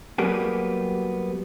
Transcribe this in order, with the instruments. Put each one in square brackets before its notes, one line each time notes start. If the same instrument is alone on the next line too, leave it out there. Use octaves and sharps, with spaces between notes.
[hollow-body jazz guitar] F#3 G3 A#3 B3 G4 G#4